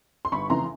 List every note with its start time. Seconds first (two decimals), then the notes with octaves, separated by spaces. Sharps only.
0.25 C6
0.32 G1 B5 C#6
0.50 F2 C#3 E3 A3 A#5 C6